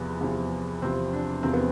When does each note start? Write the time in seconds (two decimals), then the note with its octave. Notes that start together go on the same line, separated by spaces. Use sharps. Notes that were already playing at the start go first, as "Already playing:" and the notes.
Already playing: E2 C3 F3 B3
0.20 E2 C3 F3
0.82 E2 C3 F3 C4
1.13 D4
1.43 E2 C3 F3 C4
1.53 B3